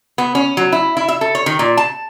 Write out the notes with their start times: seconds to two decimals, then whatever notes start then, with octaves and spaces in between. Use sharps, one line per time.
0.18 B3
0.35 C#4
0.57 F#3
0.72 E4
0.97 E4
1.08 E5
1.21 A4
1.35 C#5
1.46 D#3
1.59 A#2
1.77 A5